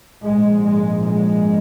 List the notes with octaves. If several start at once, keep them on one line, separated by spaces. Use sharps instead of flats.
A#1 G#2 G#3
G#3
G#3